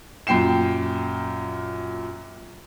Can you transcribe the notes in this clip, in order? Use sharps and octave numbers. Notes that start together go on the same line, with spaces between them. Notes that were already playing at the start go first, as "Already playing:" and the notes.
F#2 A#2 G5 C7 E7